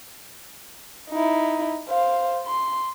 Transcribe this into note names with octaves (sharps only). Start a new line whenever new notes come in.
D#4 E4
C5 F5
C6